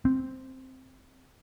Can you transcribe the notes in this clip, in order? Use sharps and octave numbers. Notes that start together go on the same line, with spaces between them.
C4